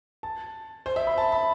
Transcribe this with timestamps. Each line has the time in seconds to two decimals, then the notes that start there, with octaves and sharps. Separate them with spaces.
0.23 A5
0.86 C5
0.96 E5
1.07 B5
1.18 A5
1.32 B5